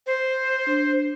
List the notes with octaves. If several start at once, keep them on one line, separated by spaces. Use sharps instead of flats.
C5
D4